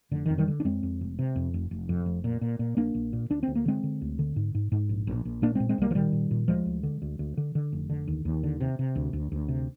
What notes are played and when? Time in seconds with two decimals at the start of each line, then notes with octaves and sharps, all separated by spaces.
0.11 F1 D3
0.26 D#3
0.30 F2
0.38 D#3 G3
0.48 D3
0.60 D4
0.65 F2 G#3 C4
0.83 F2
1.01 F1
1.19 C3
1.36 F2
1.54 F1
1.71 F1
1.89 F2
2.06 F1
2.24 A#2
2.41 A#2
2.59 A#2
2.77 A#1 A#3 D4
2.95 A#1
3.13 A#2
3.30 D2 D4
3.43 D2 C4
3.55 A#3
3.66 D3 G#3 C4
3.84 D3
4.02 D2
4.19 D3
4.36 G#2
4.55 G#2
4.72 G#2
4.89 A#1
5.07 A#1
5.25 A#1
5.42 A#2 A#3 D4
5.55 A#2 G#3 C4
5.69 G#3 C4
5.78 C2 G3 A#3
5.91 F3
5.95 A#2 D#3 G3
6.13 A#2
6.31 A#2
6.48 D2 F3 G#3
6.66 D2
6.83 D3
7.02 D2
7.19 D2
7.37 D3
7.55 D3
7.73 F1
7.90 D3
8.08 D#2
8.25 D#2
8.43 D3
8.61 C3
8.79 C3
8.96 D2
9.13 D2
9.32 D2
9.48 C3